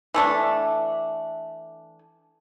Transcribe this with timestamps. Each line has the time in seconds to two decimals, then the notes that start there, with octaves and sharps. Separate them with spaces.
0.14 E3 A3 D4